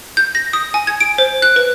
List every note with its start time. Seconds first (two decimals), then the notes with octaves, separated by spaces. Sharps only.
0.17 G6
0.35 A#6
0.53 D#6
0.74 G#5
0.87 G#6
1.00 D7
1.18 C5
1.42 F#6
1.56 B4